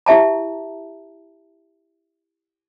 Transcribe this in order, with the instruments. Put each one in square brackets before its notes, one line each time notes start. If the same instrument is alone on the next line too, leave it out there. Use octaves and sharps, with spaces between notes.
[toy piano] E4 G4 E5 A5 A#5